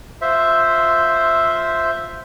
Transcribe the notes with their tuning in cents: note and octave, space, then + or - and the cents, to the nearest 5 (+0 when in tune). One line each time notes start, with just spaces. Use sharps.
F4 +10 C5 +0 E5 +0